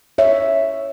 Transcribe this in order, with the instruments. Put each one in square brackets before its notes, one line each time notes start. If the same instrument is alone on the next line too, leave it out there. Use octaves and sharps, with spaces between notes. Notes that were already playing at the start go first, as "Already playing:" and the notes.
[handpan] C#5 E5